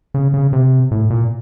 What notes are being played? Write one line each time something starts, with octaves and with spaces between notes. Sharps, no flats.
C#3
C#3
C3
A2
A#2